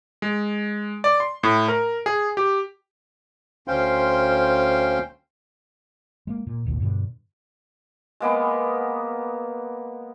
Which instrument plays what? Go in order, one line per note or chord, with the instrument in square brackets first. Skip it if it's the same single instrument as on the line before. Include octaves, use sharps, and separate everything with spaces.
[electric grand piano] G#3
D5
C6
A2
A#4
G#4
G4
[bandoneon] D2 C#4 C5 F5 G5 C6
[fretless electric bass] G#3 A#3
A#2
G#1 D2 A#2
G2 B2 D3
[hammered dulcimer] G#3 A#3 B3 G#5